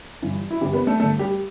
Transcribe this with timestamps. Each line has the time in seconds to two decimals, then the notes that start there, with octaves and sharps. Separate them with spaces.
0.22 G1 G2 E3
0.51 E4
0.61 G1 G2 E3 G3 G4
0.73 B3 B4
0.87 A3 A4
1.00 G1 G2 D3 A3 A4
1.19 G3 G4